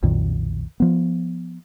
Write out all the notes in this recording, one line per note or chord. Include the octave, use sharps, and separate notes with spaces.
B1 F2 A#2 D#3
F3 B3